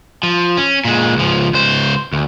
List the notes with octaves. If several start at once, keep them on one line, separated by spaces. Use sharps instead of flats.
F3
C#4
A#2 G#3
C#2 F3
C#2 C5
D2